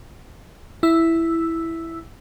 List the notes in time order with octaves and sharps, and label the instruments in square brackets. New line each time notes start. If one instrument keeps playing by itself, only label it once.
[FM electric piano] E4 E6